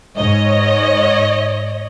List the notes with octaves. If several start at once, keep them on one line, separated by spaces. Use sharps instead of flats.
G#2 C#5 D#5